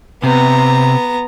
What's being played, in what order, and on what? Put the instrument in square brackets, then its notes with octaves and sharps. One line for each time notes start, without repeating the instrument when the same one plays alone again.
[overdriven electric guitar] C3 [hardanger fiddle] B3 A#5